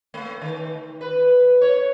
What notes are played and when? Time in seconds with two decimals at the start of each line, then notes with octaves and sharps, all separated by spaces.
0.14 A3
0.41 D#3
1.01 B4
1.61 C#5